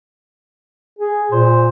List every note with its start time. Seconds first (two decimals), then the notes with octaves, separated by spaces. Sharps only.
0.99 G#4
1.32 A#2 C5